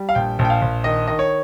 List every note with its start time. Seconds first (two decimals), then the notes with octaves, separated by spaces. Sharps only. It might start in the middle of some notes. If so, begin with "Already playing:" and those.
Already playing: G3
0.09 F5
0.15 A#1 G5
0.39 A#1
0.45 G5
0.50 F5
0.62 A#1
0.84 D#3 D#5
1.07 D#3 D#5
1.19 C#5